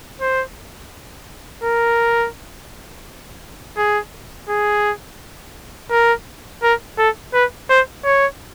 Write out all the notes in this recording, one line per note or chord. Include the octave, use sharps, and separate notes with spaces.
C5
A#4
G#4
G#4
A#4
A#4
A4
B4
C5
C#5